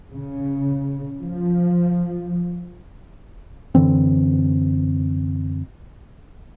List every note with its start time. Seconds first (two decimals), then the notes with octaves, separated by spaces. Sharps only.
0.13 C#3
1.22 F3
3.75 F#2 D3 E3 C4